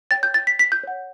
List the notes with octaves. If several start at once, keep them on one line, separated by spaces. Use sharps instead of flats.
C#5 G5 A6
G6
A6
B6
B6
G6
C#5 F#5